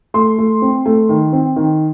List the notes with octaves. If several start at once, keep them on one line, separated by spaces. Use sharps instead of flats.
A3 C6
A3
C4
A3
D#3
C4
D#3